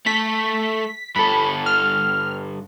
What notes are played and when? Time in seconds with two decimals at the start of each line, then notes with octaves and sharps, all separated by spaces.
0.06 A3 A4 B6
1.16 G2 A4 B5
1.66 F6